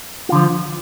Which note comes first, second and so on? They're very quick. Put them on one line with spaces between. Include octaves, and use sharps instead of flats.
F4 D3 F3